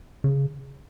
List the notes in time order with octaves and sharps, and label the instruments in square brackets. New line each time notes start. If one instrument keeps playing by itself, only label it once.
[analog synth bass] C#3